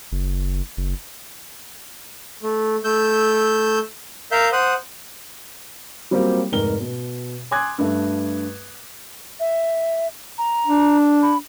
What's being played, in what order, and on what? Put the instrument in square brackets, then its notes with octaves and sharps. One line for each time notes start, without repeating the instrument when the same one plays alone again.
[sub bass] F#1
F#1
[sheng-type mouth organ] A3
A3 E6 G6
A#4 E5 F5 G6
C5 F#5 D#6
[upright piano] F#3 G3 A#3 C4 F4 G4
F1 G#2 A#4 G7
B2
G#5 C6 D6 D#6 F#6 G#6
G2 A3
[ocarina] E5
A#5
[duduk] D4
[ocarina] B5